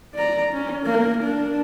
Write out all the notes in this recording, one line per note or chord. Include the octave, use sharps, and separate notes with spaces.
D5 A#5
C#4
A#3 A#4
D4